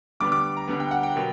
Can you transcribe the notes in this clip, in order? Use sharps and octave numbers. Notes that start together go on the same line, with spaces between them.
D3 G3 B3 D6
D6
A#5
D3 G3 B3
G5
F#5
G5
B2 F#3 A#3